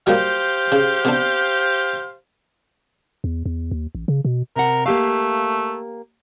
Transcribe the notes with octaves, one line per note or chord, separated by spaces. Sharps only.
F#3 G3 A#3 G4 C5 F5
C#3
C3 B3 D4
E2
E2
D#2
A1
C#3
B2
C3 A#4 F#5
A3 A#3 G4 F5